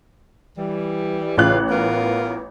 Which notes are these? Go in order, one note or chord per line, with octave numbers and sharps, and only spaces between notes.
E3 G3
A1 C#3 F4 F#6
B3 F4 A#4